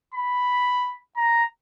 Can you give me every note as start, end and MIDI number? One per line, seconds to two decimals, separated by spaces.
0.14 0.97 83
1.17 1.44 82